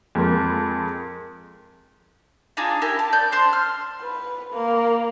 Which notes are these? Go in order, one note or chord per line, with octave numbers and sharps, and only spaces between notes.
F2 G#3 A#4
D4 D#4 F4 G#4
E4 G4 A#4 G#5
A5
D5 G6
D4 C5 C6
F6
B4
A#3